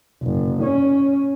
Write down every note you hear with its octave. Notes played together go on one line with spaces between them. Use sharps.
F#1
C#4